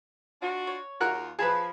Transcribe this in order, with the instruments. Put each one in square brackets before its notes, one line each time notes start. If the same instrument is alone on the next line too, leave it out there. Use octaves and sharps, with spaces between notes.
[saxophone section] D4 F4 F#4
[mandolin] C#5
[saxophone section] D#2 F4 [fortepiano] F#4 A#4 F#6
[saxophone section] F3 [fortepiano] G#4 B4 [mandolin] A5 B5